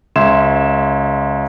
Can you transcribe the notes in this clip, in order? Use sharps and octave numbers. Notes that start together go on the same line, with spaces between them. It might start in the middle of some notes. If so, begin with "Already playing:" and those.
C#2 E5 C6 G#6 E7